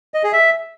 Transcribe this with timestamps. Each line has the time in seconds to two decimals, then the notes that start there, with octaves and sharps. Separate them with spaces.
0.14 D#5
0.23 G#4
0.33 E5